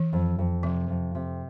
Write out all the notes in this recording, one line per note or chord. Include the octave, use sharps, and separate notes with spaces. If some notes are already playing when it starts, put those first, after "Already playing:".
Already playing: E3
F2
F2
C3 F3
F2
C3